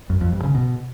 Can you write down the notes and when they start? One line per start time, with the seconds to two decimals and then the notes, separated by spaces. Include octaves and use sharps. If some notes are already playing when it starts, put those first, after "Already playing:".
0.10 F#2
0.21 F2
0.32 G2
0.43 C#3
0.55 B2